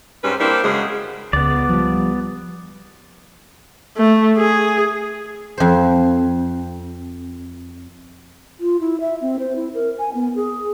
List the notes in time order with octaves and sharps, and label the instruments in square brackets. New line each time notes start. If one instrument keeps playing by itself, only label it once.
[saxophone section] G#2 G3 C4 C#4 B4
G3 A#3 C4 D4 E4
F#2 C#3 F#3 G#3
[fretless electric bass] C#2 [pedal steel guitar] B3 D5
[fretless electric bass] F3 G3
[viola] A3
G#4
[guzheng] F2 C5
[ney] F4
E4
E5
C4
C5
E4
A#4
G#5
B3
G#4